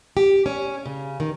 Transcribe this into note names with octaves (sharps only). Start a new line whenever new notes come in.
G4
C#4
C#3
D#3